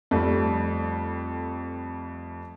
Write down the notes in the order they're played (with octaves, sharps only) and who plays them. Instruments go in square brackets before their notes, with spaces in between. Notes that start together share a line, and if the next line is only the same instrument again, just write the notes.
[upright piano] F2 G3 A3